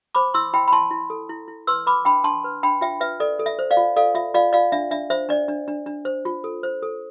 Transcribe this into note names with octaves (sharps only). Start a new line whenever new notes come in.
C5 B5 D6
E4 C6 E6
E4 G5 B5
B5
E4 A5 C6
E4
A4
E4
E4
B4 C6 E6
B4 B5 D6
D4 G5 B5
D4 A5 C6
B4
D4 G5 B5
F4 E5 G5
B4 E5
A4 D5
A4
E5
C5
D5 F5
F4
A4 D5 F5
F4 E5
F4 D5 F5
F4 D5 F5
D4 E5
D4 E5
C5 E5
D4 D5
D4
D4
D4
C5
F4
A4
C5
A4